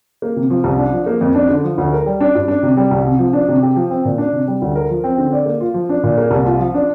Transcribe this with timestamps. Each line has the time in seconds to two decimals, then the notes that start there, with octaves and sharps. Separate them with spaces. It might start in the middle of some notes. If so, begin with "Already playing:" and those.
0.22 A#3
0.36 C3
0.50 F3
0.64 C2
0.78 D4
0.93 F3
1.06 A#3
1.21 F2
1.35 D4
1.49 D3
1.64 F3
1.78 D2
1.93 A#4
2.06 G3
2.21 D4
2.35 G2
2.48 D4
2.63 C3
2.77 G3
2.91 C2
3.05 C3
3.19 F3
3.33 D4
3.48 C3
3.63 G4
3.76 F3
3.90 C4
4.05 A#2
4.18 D4
4.32 C3
4.47 G3
4.62 D2
4.75 A#4
4.90 F3
5.04 C4
5.18 D3
5.32 D5
5.46 A#3
5.61 F4
5.74 F3
5.89 D4
6.03 A#2
6.18 A#3
6.31 C2
6.46 F4
6.60 F3
6.74 D4